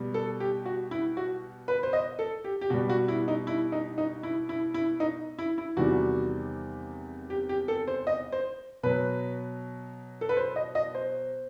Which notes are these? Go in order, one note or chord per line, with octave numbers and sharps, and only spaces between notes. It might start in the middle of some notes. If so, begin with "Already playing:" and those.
Already playing: B2 G3
A4
G4
F#4
E4
F#4
B4
C5
D#5
A4
G4
G4
B2 G3 F#4
F#4
E4
D#4
E4
D#4
D#4
E4
E4
E4
D#4
E4
E4
E2 C3 D#3 G3 F#4
G4
G4
A4
C5
D#5
C5
B2 F#3 B4
A4
B4
C5
D#5
D#5
C5